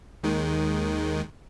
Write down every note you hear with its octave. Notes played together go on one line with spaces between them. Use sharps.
D#2 D#3 G#3